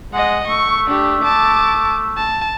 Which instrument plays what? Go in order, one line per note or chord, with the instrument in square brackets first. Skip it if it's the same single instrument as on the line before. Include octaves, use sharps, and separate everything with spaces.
[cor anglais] G#3 [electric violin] D#5 F#5
[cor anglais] A3 [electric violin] C#6
[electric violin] D4 G4
A5 D6
A5